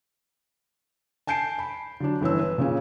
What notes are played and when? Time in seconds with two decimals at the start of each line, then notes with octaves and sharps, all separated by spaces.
1.27 G#5 A5 G6 C7 D7
1.59 B5
2.00 D3 F#3 D4
2.21 G1 E3 C#4 E6
2.39 B4
2.58 A#2 C#3 C#4